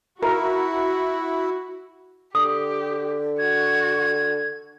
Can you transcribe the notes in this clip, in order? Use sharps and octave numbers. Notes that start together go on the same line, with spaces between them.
E4 F#4 A#4
D3 G4 D#6
F#4 G#6